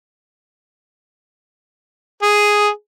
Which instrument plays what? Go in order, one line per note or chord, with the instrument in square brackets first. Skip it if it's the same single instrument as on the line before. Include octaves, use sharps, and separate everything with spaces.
[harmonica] G#4